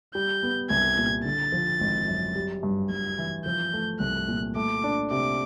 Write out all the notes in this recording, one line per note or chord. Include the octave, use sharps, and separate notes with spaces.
G3 G6
B3
C2 G#6
A#2
D3 A6
F3
G#1
F#2
G3
G2
G2 G#6
E3
F3 G6
A3
C2 F#6
A#2
A3 D6
D4
C3 D6